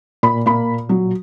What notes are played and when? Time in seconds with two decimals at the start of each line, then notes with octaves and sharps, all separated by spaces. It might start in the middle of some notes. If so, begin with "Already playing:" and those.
0.23 A#2 B5
0.46 A#3 B5
0.89 F#3